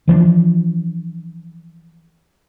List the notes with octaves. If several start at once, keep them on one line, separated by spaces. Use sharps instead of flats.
E3 F3 A3 D4